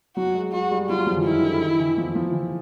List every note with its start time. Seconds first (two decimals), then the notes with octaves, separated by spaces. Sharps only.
0.16 F#3 F#4
0.35 G#3
0.52 G#3 F#4
0.71 G3
0.89 F#3 F4
1.07 F3
1.16 E3
1.24 D#3 E4
1.43 D3
1.61 D#3
1.80 E3
1.98 F3
2.16 F3
2.33 E3